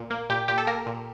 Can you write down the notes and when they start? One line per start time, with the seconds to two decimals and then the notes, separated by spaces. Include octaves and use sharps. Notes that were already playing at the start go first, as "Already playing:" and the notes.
Already playing: A#2
0.10 A#3
0.29 A#2 G4
0.48 A#2 G4
0.58 A4
0.67 A#3 A#4
0.86 A#2